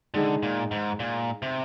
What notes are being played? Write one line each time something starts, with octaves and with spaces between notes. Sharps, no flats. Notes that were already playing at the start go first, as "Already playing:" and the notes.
D3 D#3 G#3 D#4 G#4
A#2
G#2
A#2
C3